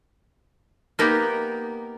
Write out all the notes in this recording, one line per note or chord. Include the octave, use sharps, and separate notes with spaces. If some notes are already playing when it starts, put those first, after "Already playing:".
A#3 B3 D#4 G4 A#4